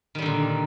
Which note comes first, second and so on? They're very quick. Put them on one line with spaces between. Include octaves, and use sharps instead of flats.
D#3 G3 D3 A#2